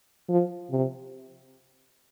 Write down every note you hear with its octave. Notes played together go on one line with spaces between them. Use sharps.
F3
C3